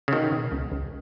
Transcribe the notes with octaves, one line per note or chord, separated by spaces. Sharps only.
C#3
B2 D#3
B2
C#2
C#2